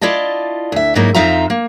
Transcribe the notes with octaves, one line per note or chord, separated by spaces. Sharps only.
E4 F4 D5 D#5 A5
D2 E5
G#2 F#3 A#3 D#4 E4
F2 C4 D#4 F4 E5 A#5
A#3